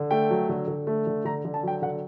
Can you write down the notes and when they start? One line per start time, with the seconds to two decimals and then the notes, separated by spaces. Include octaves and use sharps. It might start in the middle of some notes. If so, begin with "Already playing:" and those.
Already playing: D3
0.11 A3 G5
0.30 F#3
0.49 D3
0.68 D3
0.87 A3
1.07 D3
1.25 D3 A#5
1.45 D3
1.54 A5
1.63 F#3 G5
1.82 D3 F#5